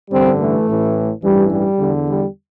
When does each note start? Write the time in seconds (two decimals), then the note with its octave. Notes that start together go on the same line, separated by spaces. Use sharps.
0.11 A1 G2 D3 G3 C4
0.39 E3 A3
0.67 A1 A2 E3
1.23 A1 G2 E3 G3
1.51 G3
1.79 E2 D3
2.07 G3